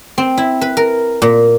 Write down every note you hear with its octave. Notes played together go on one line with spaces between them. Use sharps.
C4
E4
B4
A#4
A#2